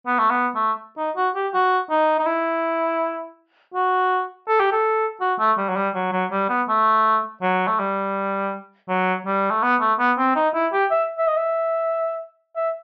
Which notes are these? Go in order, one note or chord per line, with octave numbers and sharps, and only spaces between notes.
B3
A3
B3
A3
D#4
F#4
G4
F#4
D#4
D#4
E4
F#4
A4
G4
A4
F#4
A3
G3
F#3
G3
F#3
F#3
G3
B3
A3
F#3
A3
G3
F#3
G3
A3
B3
A3
B3
C4
D#4
E4
G4
E5
E5
D#5
E5
E5